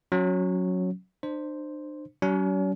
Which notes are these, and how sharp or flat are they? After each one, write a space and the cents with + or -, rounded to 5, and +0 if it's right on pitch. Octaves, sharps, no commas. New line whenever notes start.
F#3 -10 C#4 -5
D4 +40 C5 +0
F#3 +45 C#4 +40